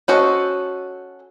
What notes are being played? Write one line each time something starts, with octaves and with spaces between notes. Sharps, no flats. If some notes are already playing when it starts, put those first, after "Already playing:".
C#4 F#4 A4 C5 D#5